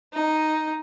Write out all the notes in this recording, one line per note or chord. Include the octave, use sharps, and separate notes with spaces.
D#4